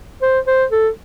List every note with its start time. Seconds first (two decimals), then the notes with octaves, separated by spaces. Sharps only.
0.22 C5
0.47 C5
0.71 A4